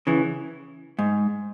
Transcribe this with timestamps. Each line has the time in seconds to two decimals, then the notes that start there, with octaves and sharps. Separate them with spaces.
0.07 C#3 E3
0.99 G#2